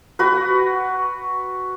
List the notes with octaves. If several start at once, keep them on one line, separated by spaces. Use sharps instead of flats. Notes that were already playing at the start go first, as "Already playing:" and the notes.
F#4 B4